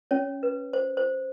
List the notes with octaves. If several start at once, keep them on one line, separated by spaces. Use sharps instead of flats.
C#4 C#5
B4
C5
C5